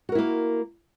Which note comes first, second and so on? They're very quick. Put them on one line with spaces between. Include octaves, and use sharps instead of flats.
F#4 A#4 E4 A#3